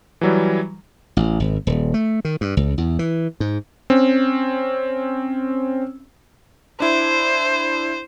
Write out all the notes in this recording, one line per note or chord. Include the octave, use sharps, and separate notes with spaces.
E3 F#3 G3
A1
G#1
D#1
A3
D#3
G2
C#2
E2
E3
G#2
C4 C#4
D4 E4 C5